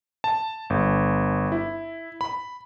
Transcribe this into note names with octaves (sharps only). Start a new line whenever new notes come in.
A5
G1
E4
B5